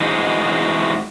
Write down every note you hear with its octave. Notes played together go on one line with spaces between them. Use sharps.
E3 G#3 D#4 F#4 G#4 C5